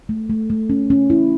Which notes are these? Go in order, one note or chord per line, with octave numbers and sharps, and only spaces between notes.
A3
A3
A3
C#4
C#4
E4